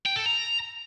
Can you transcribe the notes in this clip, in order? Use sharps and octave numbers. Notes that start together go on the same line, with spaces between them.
G5
A4
A#5